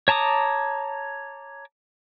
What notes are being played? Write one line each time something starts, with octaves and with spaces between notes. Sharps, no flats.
C#5 A5 A#5 D6 D#6